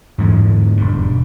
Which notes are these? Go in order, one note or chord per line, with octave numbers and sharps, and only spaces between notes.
E2 G#2 D3 G#3
E1 G2